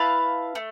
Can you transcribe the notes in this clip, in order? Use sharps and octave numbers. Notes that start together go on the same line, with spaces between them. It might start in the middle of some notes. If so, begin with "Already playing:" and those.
Already playing: E4 B4 F5 A5
A3